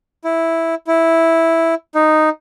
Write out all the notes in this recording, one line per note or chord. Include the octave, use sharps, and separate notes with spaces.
E4
E4
D#4